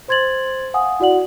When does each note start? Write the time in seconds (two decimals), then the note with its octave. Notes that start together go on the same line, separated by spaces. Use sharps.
0.08 C5 C6 G#6 A6 F#7
0.74 F5 F#5 G#5 D#6
1.00 E4 F#4 D5 F#5 F#7